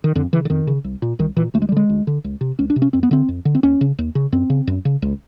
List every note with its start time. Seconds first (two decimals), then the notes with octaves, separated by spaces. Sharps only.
0.04 D#3
0.15 F2 D3
0.33 C#3 E3
0.45 D3
0.50 F2 D#3
0.67 C#3
0.84 C2
1.02 A#2
1.19 C2 D#3
1.36 A#2 E3
1.54 D2 A3
1.62 G#3
1.69 G3
1.72 D3 G#3
1.89 D2
2.07 D3
2.24 C#2
2.41 C3
2.59 C#2 C#4
2.70 D4
2.76 C3
2.82 C#4
2.93 F2 C4
3.03 B3
3.11 D3 C4
3.29 F2
3.45 D3
3.55 C4
3.63 D#2 C#4
3.81 C#3
3.99 D#2
4.15 C#3
4.32 F#2 C4
4.50 C#3
4.67 F#2
4.85 C#3
5.02 C#2